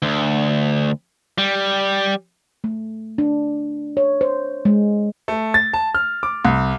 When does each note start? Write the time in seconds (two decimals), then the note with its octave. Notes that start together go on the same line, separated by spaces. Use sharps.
0.02 D2
1.38 G3
2.64 A3
3.18 D4
3.97 C#5
4.21 C5
4.65 G#3
5.28 A3
5.54 A6
5.73 A5
5.95 F6
6.23 D6
6.45 C2